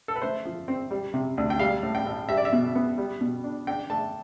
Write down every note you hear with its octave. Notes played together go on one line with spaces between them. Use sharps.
A4
B4
A3 C5
F3
C4
G3
C3
D2
G5
G3 F5
A2
G5
A1
G3 E5
D5
E5
B2
B3
G3
B2
D4
D4 G5
A3 A5